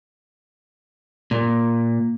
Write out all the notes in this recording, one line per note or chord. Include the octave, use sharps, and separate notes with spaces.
A#2